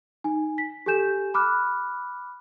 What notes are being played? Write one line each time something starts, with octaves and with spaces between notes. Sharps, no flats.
D#4 G#5
B6
G4 A4 G#5 G6 E7
B5 D6 F6 F#6